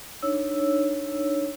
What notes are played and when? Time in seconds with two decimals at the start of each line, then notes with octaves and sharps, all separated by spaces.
0.22 D4 D#4 C#5 E6